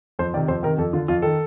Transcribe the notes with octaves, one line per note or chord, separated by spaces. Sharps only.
F2 C5
C3 D#3 D5
F2 C5
C3 D#3 A#4
F2 A4
D3 F4
F2 F4
D#3 A4